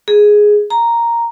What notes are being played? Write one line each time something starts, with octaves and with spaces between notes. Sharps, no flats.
G#4
A#5